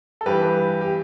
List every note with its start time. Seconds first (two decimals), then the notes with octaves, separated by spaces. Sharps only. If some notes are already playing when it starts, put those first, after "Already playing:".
0.21 A4
0.26 G2 E3 G4 B4
0.81 G4